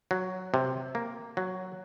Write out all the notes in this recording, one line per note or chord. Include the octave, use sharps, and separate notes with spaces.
F#3
C3
A#3
F#3